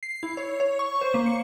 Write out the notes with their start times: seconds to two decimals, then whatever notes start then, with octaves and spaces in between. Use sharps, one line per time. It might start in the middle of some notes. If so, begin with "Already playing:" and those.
0.03 C7
0.23 E4
0.37 C#5
0.60 C#5
0.79 C#6
1.01 C5
1.14 A#3
1.26 C#7